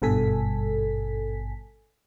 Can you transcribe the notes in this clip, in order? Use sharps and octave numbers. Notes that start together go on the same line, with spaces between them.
G#1 G2 B2 A4 G#5 B6